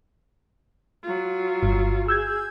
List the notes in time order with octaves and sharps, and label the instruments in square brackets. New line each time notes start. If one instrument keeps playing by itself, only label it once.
[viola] F#3 F4
[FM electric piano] G1 G2
[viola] G#4 [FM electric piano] E6 G6 G#6